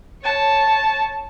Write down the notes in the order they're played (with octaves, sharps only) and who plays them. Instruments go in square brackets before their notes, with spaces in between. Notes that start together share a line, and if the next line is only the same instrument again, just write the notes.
[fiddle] C#5 A5